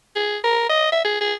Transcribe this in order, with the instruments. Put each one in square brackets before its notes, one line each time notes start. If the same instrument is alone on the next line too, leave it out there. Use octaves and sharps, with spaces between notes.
[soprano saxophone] G#4
A#4
D#5
E5
G#4
G#4